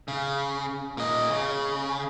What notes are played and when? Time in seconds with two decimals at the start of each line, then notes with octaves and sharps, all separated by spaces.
0.08 C#3
0.97 A#2 D#5
1.30 C#3